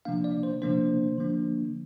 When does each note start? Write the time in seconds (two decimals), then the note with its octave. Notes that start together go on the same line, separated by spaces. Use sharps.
0.05 C3 F3 A#3 D4 F5
0.24 D5
0.43 C5
0.62 C3 F3 A#3 D4 C5
1.18 D3 F3 A#3 D4